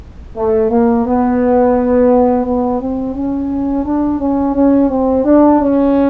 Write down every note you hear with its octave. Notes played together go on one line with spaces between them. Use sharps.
A3
A#3
B3
B3
C4
C#4
D4
C#4
C#4
C4
D4
C#4